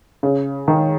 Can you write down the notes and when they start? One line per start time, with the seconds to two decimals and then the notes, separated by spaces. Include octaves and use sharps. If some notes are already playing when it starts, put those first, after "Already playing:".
0.23 C#3
0.68 D#3